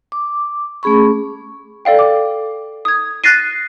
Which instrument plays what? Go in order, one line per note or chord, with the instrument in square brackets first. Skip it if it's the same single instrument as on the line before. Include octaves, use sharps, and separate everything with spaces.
[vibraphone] D6
A3 C#4 G#4 B5 C#6
[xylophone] A4 D5 F5 G5
D6
D#6 G#6
F#6 A6 A#6 C7 D#7